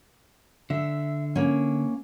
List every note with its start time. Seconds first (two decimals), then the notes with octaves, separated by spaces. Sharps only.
0.70 D3 E5
1.36 A#3 C#4